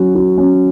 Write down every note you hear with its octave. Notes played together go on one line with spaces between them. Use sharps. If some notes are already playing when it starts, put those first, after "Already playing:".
Already playing: F#3 C#4 F#4
F#4
C#4